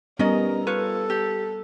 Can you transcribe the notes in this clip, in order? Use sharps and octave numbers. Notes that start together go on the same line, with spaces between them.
G3 B3 C#4 D#4 A#4 D#5
F4 A4 B4 C#5
G4